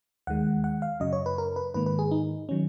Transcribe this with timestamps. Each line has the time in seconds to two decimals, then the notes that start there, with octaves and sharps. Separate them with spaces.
0.27 D#2 D#3 G#3 F#5
0.64 F#5
0.82 F5
1.00 F#2 C#3 F#3 D#5
1.13 C#5
1.26 B4
1.38 A#4
1.56 B4
1.74 G#2 D#3 A#3 B4
1.86 B4
1.99 G#4
2.11 D#4
2.49 D#3 F#3 C#4